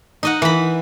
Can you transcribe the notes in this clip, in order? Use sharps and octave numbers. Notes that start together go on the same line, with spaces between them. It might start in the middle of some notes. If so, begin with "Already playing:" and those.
D#4 D#5 F#5
E3 B5